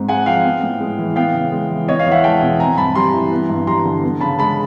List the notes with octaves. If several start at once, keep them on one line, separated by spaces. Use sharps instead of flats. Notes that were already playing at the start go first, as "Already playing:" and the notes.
Already playing: G#2 C4
G#3 F#5 G#5
F3 F5 G5
B3
A2
G#3
E3
B3 F5 G5
C#3
G#3
E3
B3 C#5 D#5
D#5 F5
E2
E5 F#5
G#3 G5 A5
B2
C4 G#5 A#5
G2 A5 B5
G3 A#5 C6
E3
B3
G2
G3 A#5 C6
D3
B3
C#3 A5 B5
G#3 A5 B5